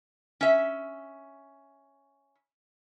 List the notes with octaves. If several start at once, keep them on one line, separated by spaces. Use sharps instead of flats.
C#4 E5